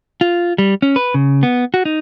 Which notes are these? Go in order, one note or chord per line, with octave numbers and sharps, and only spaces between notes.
F4
G3
C#4
B4
C#3
B3
F#4
D#4